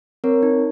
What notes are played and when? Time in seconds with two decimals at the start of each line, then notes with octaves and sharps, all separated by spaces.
0.24 C4 A#4 C#5
0.43 D#4